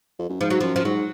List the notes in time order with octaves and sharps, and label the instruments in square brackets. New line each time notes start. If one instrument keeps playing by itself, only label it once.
[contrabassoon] F2
F#2
[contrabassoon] G#2 [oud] F3
[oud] F#3
[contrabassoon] F#2 [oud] F3
[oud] F3
[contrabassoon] G#2 [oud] F#3